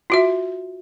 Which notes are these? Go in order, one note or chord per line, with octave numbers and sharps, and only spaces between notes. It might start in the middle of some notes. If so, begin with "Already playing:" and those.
F4 F#4 E5